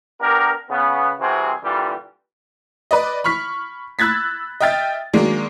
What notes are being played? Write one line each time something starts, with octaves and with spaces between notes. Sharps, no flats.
B3 D4 G4 A#4
C#3 B3
C3 E3 G3 C4 F#4 G#4
A#2 D3 E3 G3
B4 D5 D#5
B5 C#6 F6 B6
B5 E6 F#6 G#6 A6 B6
D#5 E5 G5 F6 A6
D#3 F#3 G#3 A#3 D4